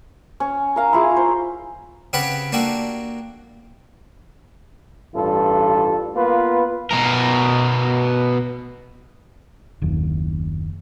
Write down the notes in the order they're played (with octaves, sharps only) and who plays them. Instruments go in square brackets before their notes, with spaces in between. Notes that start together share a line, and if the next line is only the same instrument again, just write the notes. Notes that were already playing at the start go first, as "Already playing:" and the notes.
[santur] C#4
A#4 F5 A#5
E4 F4 G#4
C5
[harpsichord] C#3 C4 G4 B4 F#5 B5
A#3 D4 F#4 G4 A4
[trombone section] A1 G2 F4 A4
A#3 B3 F4 B4
[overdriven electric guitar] B2 A#4
[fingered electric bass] F#1 D#2